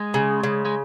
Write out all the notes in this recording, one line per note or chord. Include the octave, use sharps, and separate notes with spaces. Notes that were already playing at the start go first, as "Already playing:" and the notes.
Already playing: G#3
C#3
C#3
G#3